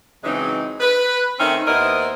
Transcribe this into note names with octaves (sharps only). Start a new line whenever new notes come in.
C#3 E3 F#3 G#3 C4 D#4
B4
D#3 A3 C4 C#4 D#4
D#2 B3 E4 A#4 C5 D#5